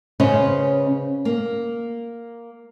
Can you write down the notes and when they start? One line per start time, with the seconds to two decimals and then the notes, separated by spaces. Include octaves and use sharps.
0.20 C#3 C#4 B4 C5 D#5
1.25 A#3